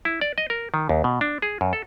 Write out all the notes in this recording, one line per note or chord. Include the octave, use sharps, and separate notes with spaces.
E4
D5
D#5
A#4
D#3
D#2
B2
D4
G#4
F#2
A4